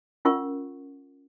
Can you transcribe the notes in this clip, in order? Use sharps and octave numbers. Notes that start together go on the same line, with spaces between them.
C#4 F4 A#4 F#5 C#6